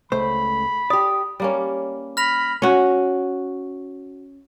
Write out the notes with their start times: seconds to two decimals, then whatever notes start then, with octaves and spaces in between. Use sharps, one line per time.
0.12 C#2 A3 C5 B5
0.90 G4 D5 D#6
1.40 G3 A#3 C#4
2.17 B5 F6 A#6 F7
2.62 C#4 F#4